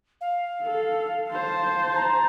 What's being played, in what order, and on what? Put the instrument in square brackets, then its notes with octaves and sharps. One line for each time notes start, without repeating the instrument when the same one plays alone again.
[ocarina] F5
[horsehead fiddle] A4
C5 A5
[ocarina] A#5